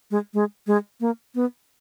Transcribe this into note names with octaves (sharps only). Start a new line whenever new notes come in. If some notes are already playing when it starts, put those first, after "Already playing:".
G#3
G#3
G#3
A#3
B3